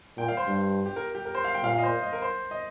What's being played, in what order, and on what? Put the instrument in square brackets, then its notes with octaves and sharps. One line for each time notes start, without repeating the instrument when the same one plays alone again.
[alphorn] A#2 [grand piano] G5
[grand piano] F5
C5
[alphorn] G2
[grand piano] G4
A#4
G4
A#4
C5
F5
G5
[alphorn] A#2 [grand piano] F5
[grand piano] D#5 F5
C5
D#5
A#4
C5
D#5